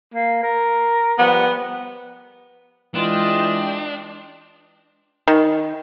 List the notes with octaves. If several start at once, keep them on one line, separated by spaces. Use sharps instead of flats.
A#3
A#4
F3 G3 B3
E3 G#3 D4 F4 D#5 G5 E7
D#3